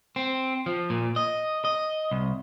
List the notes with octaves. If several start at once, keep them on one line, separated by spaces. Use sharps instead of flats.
C4
F3
A#2
D#5
D#5
C2